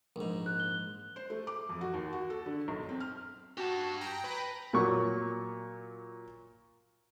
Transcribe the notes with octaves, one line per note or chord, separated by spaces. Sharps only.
A#1 G#2
F#6
G7
C5
A3
D6
F2
F#4
D#2
F#4
A4
D3
B1
C4
F6
F#4 G4 A5
G5 A#5 A#6
B4
A#2 F#3 C#6